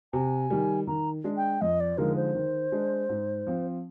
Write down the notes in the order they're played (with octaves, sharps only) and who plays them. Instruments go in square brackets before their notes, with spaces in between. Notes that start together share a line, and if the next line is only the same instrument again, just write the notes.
[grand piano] C3 [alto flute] G#5
[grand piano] D#3 G3
[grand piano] D#3 [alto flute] A#5
[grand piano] G#3 D4
[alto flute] G5
[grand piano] F2 [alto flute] D#5
[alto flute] D5
[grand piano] D3 F3 G#3 D#4 [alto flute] A#4
[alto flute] C5
[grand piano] D#3
G#3 D4
G#2
F3 C4